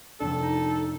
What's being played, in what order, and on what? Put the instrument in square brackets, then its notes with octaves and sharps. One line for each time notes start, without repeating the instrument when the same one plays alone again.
[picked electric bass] F2 C3 D4 [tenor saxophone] A4
[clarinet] D#4